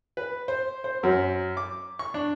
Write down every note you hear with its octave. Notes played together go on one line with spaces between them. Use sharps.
B4
C5
C5
F#2
D6
C#6
D4